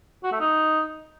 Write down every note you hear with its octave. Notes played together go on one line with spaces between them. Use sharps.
F#4
A3
D#4